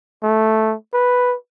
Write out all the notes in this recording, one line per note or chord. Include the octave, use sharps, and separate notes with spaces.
A3
B4